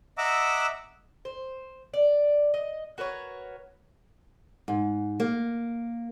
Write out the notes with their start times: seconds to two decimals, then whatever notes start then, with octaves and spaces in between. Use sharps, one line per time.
0.18 D#5 E5 F#5 A#5 D6 E6
1.25 C5
1.94 D5
2.54 D#5
2.98 F#4 A#4 B4 C#5
4.68 G#2
5.20 A#3